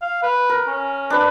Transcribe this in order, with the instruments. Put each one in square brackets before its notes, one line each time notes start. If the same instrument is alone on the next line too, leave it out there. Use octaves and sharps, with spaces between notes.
[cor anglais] F5
B4
[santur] A#4
[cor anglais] C#4
[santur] D4 B4